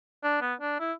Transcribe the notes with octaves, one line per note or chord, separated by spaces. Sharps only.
D4
B3
D4
E4